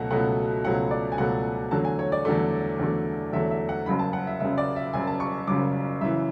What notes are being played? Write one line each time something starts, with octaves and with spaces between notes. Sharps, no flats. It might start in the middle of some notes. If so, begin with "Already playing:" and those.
Already playing: C#2 B2 F#3 A3 F#5
C#2 B2 F#3 A3 F#5
C#2 B2 F#3 A3 F#5
D5
G#5
C#2 B2 F#3 A3 F#5
E2 D3 F#3 A3 A5
G#5
C#5
D5
E2 D3 F#3 A3
E2 D3 F#3 A3
E2 D3 F#3 A3 E5
E5
F#5
F#1 F#2 C#3 B5
A5
F#5
E5
F#1 F#2 C#3 E5
D5
E5
F#1 F#2 C#3 G#5
A5
C#6
F#1 F#2 C#3 D6
F#2 C#3 E3 E5